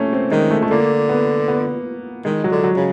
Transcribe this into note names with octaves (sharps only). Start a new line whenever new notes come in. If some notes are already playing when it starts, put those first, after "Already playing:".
Already playing: A3 A#3 C#4
C4
D#3 G#3
A3
A3
D3 A#3
B3
B3
D#3 G#3
F#3
D3
F#3
C#3